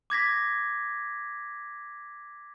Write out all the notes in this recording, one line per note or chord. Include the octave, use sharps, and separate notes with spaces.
D6 G#6 A#6 B6